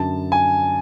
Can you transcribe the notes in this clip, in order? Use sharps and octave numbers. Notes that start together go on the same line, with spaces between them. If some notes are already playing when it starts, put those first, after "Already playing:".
Already playing: F#2 D3 F#3 A5
G#5